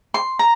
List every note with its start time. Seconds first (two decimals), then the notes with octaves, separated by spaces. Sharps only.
0.14 C6
0.39 A#5